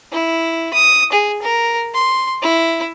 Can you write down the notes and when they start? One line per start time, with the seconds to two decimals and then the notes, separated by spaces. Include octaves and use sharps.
0.13 E4
0.74 D#6
1.12 G#4
1.42 A#4
1.95 C6
2.42 E4